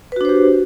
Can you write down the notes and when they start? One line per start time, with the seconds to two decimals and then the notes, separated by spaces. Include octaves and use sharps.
0.12 B4
0.16 F#4
0.21 D4
0.25 C5
0.29 G4